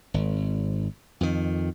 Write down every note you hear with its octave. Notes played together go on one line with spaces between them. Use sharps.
G#1
F2 D#3